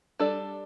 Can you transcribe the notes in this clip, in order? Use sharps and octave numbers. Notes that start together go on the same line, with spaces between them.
G3 D4 A4 D5